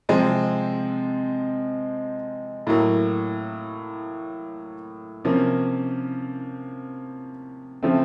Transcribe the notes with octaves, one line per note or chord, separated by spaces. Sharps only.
C3 F3 G#3 C4
A2 F#3 A#3
C3 F3 A#3 C#4
C#3 F3 A3 C4